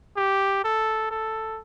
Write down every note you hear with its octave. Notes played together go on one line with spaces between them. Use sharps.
G4
A4
A4